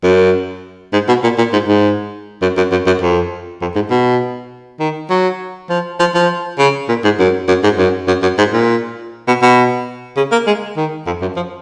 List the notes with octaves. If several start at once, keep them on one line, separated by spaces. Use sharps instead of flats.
F#2
G#2
B2
A#2
A#2
G#2
G#2
F#2
F#2
F#2
F#2
F2
F2
G#2
B2
D#3
F#3
F3
F3
F3
C#3
A#2
G#2
F#2
F#2
G#2
F#2
F#2
F#2
G#2
A#2
B2
B2
C#3
A#3
G#3
D#3
F2
F#2
F3